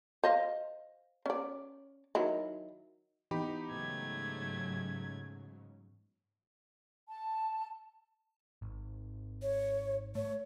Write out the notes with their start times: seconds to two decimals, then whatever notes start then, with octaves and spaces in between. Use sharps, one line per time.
0.24 C5 D#5 F5
1.26 C#4 D5
2.15 D#3 F#3 E4
3.31 E3 B3 D#4 G4 B5
3.70 G#2 C#3 F#3 A3 G#6
7.07 A5
8.62 G#1
9.42 C#5
10.15 A3 C#5